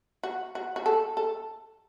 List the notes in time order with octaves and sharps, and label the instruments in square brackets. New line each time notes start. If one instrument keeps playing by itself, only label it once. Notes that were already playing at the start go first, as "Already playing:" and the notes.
[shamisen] F#4
F#4
F#4
A4
A4